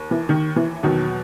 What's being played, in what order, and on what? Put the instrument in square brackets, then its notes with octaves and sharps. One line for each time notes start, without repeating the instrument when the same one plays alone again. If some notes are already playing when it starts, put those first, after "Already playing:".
Already playing: [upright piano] D#2
[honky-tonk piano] E3
D#3
E3
[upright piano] E2 B2 F#3 [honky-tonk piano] D#3